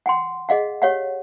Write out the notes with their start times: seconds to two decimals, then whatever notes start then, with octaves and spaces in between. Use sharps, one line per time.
0.06 F#5 G5 C6
0.49 G#4 D#5 F5 F#5
0.82 G4 C#5 F5 F#5